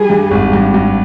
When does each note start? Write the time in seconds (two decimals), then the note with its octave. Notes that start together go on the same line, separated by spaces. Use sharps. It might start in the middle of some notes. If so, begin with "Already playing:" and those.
Already playing: G3 G#4
0.10 G2
0.31 G#1
0.53 G2
0.74 G2